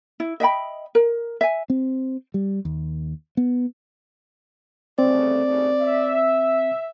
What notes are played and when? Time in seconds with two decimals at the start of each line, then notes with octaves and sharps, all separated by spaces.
0.20 E4
0.40 D#5 E5 G5 B5
0.95 A#4
1.41 E5 G#5
1.70 C4
2.34 G3
2.65 D#2
3.37 B3
4.99 G1 C#3 A3 C4 D5
5.46 D#2 C#3 A3
5.81 E5